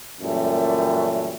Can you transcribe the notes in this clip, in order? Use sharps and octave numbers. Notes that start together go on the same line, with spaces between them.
F#2 A#2 E3 G3 A3 C#4